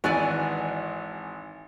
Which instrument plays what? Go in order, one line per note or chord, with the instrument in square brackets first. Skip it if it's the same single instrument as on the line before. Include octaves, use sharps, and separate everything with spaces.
[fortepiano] G#1 E3 F#6 [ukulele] F#4 D5 G#5